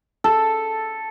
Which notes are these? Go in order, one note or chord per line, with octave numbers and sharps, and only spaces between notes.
A4